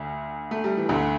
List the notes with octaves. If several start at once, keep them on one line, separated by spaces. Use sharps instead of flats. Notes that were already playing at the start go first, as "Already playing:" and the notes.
Already playing: D2 D3
A3
G3
E3
D2 D3